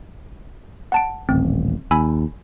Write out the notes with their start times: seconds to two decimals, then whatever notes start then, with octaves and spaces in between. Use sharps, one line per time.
0.92 F#5 A5 D7
1.29 D#1 A1 C4
1.91 D#2 G#5 B5 E6